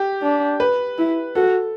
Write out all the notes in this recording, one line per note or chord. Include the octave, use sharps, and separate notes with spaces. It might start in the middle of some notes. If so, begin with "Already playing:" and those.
Already playing: G4
D4
B4
E4
F#4 A4